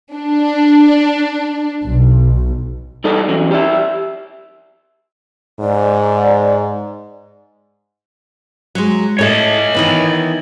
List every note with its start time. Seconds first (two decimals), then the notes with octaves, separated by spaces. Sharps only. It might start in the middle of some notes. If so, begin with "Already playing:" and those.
0.15 D4
1.84 B1
3.04 G3 D#4 A4 D5 D#5
3.28 E3 F#3 C#4
3.51 G4 D5 E5
5.60 G#2 D5
8.75 F#3 G#3
9.19 A2 A4 C#5 D#5
9.74 D#3 E3 B3